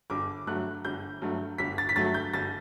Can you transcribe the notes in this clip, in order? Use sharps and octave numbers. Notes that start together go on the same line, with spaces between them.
G1 D6
G2 F#3 A3 F#6
G1 G6
G2 F#3 A3
G1 B6
A6
B6
G2 F#3 A3 A6
G6
G1 A6